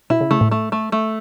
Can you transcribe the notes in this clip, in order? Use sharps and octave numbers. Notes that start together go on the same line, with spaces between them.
B2 E4
C#3
C#3 A3
A2
A3
A3
A3